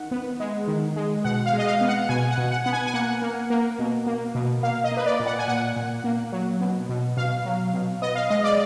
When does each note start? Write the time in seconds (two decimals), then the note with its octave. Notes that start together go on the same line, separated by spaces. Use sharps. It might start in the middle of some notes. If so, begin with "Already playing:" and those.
Already playing: D#3 F#5
0.11 B3
0.40 G#3
0.68 D#3
0.96 G#3
1.25 B2 F#5
1.46 F5
1.53 G#3
1.58 D#5
1.67 F5
1.81 B3
1.88 F#5
2.09 B2 G#5
2.30 F#5
2.38 B2
2.51 F#5
2.64 B3 F#5
2.73 G#5
2.86 G#5
2.94 A#3 F#5
3.22 A#3
3.50 A#3
3.79 B2
4.07 A#3
4.35 B2
4.63 A#3 F5
4.84 D#5
4.92 A#3
4.97 B4
5.06 D5
5.20 A#2
5.26 F#5
5.39 G#5
5.47 A#2 F#5
5.76 A#2
6.04 A#3
6.32 F#3
6.61 B2
6.89 B2
7.17 B2 F5
7.45 F#3
7.74 B2
8.02 B3 D#5
8.15 F5
8.29 G#3 D#5
8.44 D5